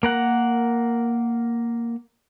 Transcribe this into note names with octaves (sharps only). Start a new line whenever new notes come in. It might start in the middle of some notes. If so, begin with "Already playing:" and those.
A#3 A#4 F#5